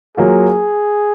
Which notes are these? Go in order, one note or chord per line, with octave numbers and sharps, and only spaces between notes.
F#3 A#3 F4 G#4